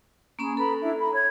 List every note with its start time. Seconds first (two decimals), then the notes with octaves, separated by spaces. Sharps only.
0.39 A#3 C#4 G#4 B5
0.57 A4 B4 A#5 B5
0.81 D4 E4 E5
0.98 A#5 B5
1.13 C#5 G#6